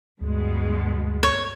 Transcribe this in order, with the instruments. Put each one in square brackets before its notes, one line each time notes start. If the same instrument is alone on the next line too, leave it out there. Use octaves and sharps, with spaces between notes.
[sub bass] D2 [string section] G2 B2 G#3
[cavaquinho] C#5